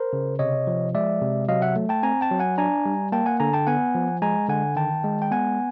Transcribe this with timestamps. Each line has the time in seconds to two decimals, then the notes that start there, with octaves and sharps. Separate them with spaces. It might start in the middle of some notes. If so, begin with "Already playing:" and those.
Already playing: A#4 C5
0.13 C#3
0.39 C3 C#5 D#5
0.67 F3
0.95 G#3 D5 E5
1.21 C3
1.49 F#3 D#5 F5
1.62 E5 F#5
1.76 A3
1.89 G5 A5
2.03 C4 G#5 A#5
2.21 G5 A5
2.31 F#3
2.39 F#5 G#5
2.58 D4 G#5 A#5
2.86 G3
3.12 A#3 G5 A5
3.26 F#5 G#5
3.40 D3 G#5 A#5
3.54 G5 A5
3.67 B3 F#5 G#5
3.95 F3
4.22 G#3 G#5 A#5
4.49 D3 F#5 G#5
4.76 D#3 G5 A5
5.04 G#3
5.22 G5
5.31 B3 F#5 G#5